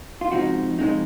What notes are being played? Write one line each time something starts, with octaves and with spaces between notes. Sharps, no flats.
F4
C#3 F3 G#3 C4 D#4 F#4
C#3 F3 G#3 C4 D#4